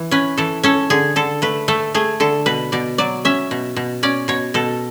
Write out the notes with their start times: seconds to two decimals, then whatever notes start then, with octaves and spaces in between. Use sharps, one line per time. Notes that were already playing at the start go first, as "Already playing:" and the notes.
Already playing: E3
0.11 C#4 B4
0.37 E3 A4
0.63 C#4 A4
0.90 D3 G#4
1.16 D3 A4
1.42 A3 B4
1.68 A3 A4
1.94 A3 G#4
2.20 D3 A4
2.46 B2 B4
2.72 B2 D5
2.98 F#3 D5
3.25 C#4 E5
3.51 B2
3.76 B2
4.03 C#4 D5
4.28 B2 C#5
4.54 B2 A4